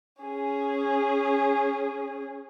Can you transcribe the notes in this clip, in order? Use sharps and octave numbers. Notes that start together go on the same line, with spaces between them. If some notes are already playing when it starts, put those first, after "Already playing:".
C#4 G#4